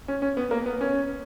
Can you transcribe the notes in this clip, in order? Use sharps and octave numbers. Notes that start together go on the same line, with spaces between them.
C#4
C#4
B3
A#3
B3
C#4